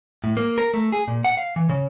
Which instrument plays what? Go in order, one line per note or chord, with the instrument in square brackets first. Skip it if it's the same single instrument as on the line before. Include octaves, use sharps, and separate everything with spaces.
[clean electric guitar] A2
A#3
A#4
A3
G#4
A#2
F#5
F5
E3
C#3